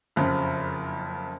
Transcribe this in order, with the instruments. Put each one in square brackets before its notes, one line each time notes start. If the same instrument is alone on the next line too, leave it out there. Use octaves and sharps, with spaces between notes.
[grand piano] F#1 F2 C#3